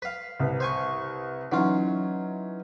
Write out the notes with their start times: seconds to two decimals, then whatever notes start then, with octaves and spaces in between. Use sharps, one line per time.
0.02 B4 F5
0.40 C2 B4
0.60 C5 G#5 C#6
1.52 E3 F#3 C#4 D#4 F4